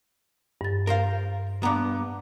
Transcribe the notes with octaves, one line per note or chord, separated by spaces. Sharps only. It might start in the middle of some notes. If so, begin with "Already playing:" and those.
G2 A6
A#4 C5 F5
G2 B3 A#5 D6